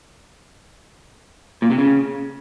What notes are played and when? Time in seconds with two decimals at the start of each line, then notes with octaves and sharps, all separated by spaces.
1.62 A#2
1.70 C3
1.79 C#3